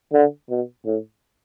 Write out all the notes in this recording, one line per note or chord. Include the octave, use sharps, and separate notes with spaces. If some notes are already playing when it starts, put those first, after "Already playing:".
D3
B2
A2